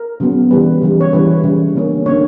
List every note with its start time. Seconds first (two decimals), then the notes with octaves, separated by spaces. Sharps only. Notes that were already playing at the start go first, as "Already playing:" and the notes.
Already playing: A#4
0.20 C#3 F#3 B3
0.51 C#3 E3 G3 B4
0.82 C#3 E3 G3
1.01 C#5
1.13 C#3 E3 G3 B4
1.44 C#3 E3 G3
1.75 D3 A#3 C#4
2.06 D3 A#3 C#4 C#5